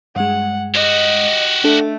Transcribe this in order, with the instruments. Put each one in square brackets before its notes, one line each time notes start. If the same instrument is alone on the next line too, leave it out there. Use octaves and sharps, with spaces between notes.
[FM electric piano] G2 G#3 [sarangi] F#5
[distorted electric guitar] F#4 G4 [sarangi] D#5
[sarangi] A3 [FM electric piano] D4 A4